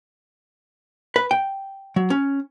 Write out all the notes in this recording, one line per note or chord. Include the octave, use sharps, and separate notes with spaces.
B4
G5
F#3
C#4